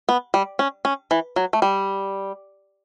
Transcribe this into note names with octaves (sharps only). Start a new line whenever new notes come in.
B3
G3
C#4
C#4
E3
F#3
A3
G3